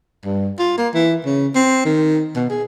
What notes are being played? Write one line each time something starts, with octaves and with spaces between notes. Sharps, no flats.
G2
F4
A#3
E3
C#3
C4
D#3
B2
G#4